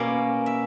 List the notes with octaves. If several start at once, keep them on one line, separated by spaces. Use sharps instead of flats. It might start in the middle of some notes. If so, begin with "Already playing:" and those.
Already playing: B2 A#3 C#4 D5
E5